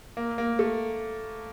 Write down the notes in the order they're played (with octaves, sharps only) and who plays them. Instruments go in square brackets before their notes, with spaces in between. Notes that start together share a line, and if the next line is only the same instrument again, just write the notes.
[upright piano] A#3
A#3
A3